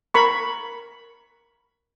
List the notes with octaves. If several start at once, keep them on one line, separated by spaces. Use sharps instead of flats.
A#4 B5 C#6